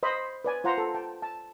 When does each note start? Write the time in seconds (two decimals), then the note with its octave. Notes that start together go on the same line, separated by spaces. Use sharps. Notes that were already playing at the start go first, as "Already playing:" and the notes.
0.03 C5 D#5 B5
0.45 B4 D5 G#5
0.64 F4 C5 F#5 A#5
0.78 A4
0.94 G5 A5
1.22 A5